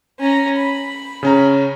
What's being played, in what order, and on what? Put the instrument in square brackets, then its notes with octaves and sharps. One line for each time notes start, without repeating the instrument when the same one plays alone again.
[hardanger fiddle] C#4 A#5
B5
[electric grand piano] C#3 C#4 A#5